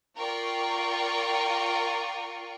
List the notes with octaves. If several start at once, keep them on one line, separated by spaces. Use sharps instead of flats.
F4 A#4 D5 G5 C#6